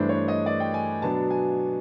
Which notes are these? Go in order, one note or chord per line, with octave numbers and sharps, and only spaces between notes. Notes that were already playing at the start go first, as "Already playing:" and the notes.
Already playing: G2 E3 A3 D4 C5
C#5
D#5
D5
G5
G#5
B2 F#3 B3 D4 A5
G#5